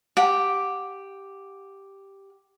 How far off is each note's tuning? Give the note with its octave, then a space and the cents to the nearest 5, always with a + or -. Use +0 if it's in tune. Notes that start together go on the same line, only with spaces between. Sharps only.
G4 +0 F#5 -25